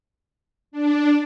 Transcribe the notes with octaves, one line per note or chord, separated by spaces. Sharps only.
D4